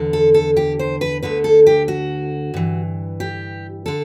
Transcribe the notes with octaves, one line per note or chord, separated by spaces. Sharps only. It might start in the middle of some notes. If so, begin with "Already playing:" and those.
Already playing: E2 D3
A4
A4
G4
C5
B4
D2 D3 B4
A4
G4
F#4
G2 E3
G4
D3 A4